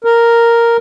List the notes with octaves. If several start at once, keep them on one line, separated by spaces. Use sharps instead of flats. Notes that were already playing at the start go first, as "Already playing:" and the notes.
A#4